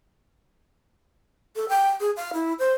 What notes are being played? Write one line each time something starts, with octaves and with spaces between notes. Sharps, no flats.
A4
G5
G#4
F5
E4
C5